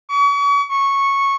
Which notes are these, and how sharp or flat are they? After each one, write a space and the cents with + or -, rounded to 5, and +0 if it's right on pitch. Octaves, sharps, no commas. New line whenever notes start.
C#6 +40
C#6 -10